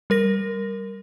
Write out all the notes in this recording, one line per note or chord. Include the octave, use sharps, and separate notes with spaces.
G3 A#4 A#6